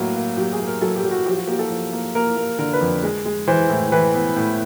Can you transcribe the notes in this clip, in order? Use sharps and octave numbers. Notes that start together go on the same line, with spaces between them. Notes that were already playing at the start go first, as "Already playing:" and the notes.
Already playing: A2 F#3 A#3 F#4
A#3
F#3 G4
G#4
A#3
A#4
F#3 A4
G4
F#3
F#4
F3 G4
F#4
A#3 G4
A4
F3
A#3
A#3 A#4
A#3
D3 A#4
B4
F2
G#3
G#3
E3 C5
A2
E3 B4
B3
A2